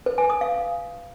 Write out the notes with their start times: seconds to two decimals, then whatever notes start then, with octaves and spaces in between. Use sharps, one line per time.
0.06 B4
0.18 G#5
0.30 D#6
0.41 F5